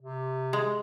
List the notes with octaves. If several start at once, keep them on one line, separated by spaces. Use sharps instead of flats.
C3
G#3